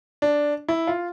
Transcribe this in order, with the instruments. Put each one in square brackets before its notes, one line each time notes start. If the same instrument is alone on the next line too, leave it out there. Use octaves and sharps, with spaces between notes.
[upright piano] D4
E4
F4